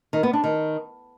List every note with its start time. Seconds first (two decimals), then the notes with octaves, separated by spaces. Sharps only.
0.13 D#3
0.23 B3
0.33 D4
0.44 D#3